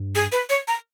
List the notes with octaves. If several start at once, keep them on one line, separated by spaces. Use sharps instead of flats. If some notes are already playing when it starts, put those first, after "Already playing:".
Already playing: G2
G#4
B4
C#5
A#5